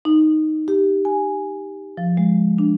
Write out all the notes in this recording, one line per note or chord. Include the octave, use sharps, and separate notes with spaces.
D#4
G4
G#5
F3
G#3
D4